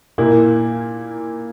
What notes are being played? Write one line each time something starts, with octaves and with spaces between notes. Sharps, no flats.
A#2 A#3 E4